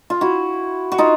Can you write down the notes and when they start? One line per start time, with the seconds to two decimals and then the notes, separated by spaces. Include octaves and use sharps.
0.10 F4
0.21 E4 F#4
0.92 F#4
0.98 D#4 F4